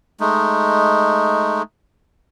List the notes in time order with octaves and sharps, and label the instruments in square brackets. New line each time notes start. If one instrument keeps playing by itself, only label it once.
[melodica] G#3 A3 D#4